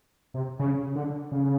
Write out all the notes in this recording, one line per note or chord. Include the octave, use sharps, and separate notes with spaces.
C3
C#3
D3
C#3